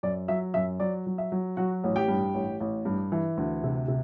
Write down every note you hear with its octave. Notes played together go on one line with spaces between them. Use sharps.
F#2 D5
F#3 E5
F#2 E5
F#3 D5
F#3
E5
F#3
F#3 F#4 F#5
A1
G4 G5
G2
A1
A1
G2
E3
D2
C3
C3